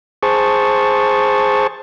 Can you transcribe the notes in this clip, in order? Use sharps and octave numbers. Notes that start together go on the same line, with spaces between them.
G#4 C5 A5 C#6